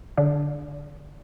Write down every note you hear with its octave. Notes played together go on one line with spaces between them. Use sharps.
D3 D4